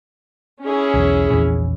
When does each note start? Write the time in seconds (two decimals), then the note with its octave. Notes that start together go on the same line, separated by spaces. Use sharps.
0.63 C#4 E4 G#4
0.94 B1 E2
1.30 A#1 E2